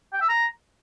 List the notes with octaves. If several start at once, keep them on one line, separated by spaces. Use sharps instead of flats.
G5
E6
A#5